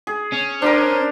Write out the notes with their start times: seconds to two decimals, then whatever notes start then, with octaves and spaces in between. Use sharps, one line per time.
0.07 G#4
0.33 C#4
0.62 D4 G4 A#4 C5